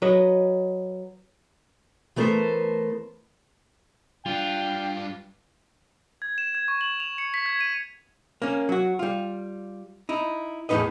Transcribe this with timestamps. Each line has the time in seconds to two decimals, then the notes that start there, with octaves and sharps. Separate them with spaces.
0.02 F#3 B4 D#5 F#5
2.16 E3 A3 B3 A4 A#4 C5
4.26 G3 D4 F4 G5
6.22 G#6
6.38 E7
6.55 G#6
6.68 C#6
6.81 F#7
7.00 F7
7.18 C#7
7.34 B6
7.46 G#6
7.61 D#7
8.42 A#3 C#4
8.69 F#3 F#4
8.99 G3 F4
10.09 D#4 E4
10.69 E2 A2 C#3 D#4 B4 D#5